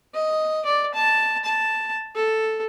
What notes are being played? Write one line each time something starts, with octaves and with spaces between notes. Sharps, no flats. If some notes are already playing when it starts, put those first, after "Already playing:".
D#5
D5
A5
A5
A4